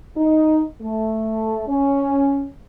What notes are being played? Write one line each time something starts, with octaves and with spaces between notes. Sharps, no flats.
D#4
A3
C#4